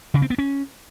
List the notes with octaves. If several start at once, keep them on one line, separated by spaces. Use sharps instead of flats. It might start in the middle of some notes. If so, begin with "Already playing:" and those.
C#3
C4
B3
C#4